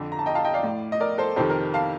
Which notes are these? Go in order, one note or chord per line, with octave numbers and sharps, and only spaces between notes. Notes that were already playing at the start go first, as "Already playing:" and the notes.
Already playing: F2 D3
A#5
A5
D#5 G5
F5 A5
D#5 G5
D5 F5
A2
D#5
A#4 D5
A4 C5
F2 C3 D#3 A4 C5
A#4
F5 A5